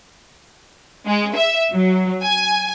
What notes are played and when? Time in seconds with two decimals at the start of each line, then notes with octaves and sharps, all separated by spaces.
1.05 G#3
1.35 E5
1.73 F#3
2.22 G#5